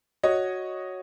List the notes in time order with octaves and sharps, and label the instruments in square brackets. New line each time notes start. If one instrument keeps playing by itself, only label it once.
[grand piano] F#4 C#5 D#5